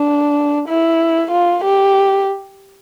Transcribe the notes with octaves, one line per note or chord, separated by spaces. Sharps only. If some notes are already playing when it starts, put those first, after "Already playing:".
Already playing: D4
E4
F4
G4